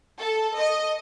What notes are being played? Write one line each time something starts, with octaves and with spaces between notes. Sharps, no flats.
A4
D#5